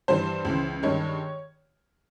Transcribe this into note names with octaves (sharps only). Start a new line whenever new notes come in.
G2 E3 G3 C5
C#2 C#3 E3
G2 D#3 G#3 C#5